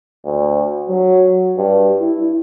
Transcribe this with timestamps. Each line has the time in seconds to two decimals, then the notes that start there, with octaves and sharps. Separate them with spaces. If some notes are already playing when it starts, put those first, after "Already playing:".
0.25 D2
0.89 F#3
1.57 G2
2.00 E4